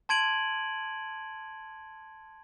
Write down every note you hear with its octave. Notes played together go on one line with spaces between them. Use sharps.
A5 C6 G#6 D7 D#7 F#7